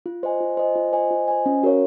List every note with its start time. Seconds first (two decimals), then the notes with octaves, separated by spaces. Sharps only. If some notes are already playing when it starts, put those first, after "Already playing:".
0.06 F4
0.23 C5 D#5 G#5
0.40 F4
0.57 C5 D#5 G#5
0.75 F4
0.93 C5 D#5 G#5
1.11 F4
1.28 C5 D#5 G#5
1.46 C#4
1.63 F#4 A#4 C#5 F5